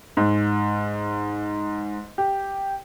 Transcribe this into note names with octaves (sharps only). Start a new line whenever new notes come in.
G#2
G4